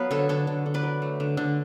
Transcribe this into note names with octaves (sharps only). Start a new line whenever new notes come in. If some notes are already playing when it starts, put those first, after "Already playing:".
Already playing: F#3 B3 B4 F5
D3 A4 C#5
D3 A4 C#5
D3
D3
B4 D5
F#3
A3
D3
D3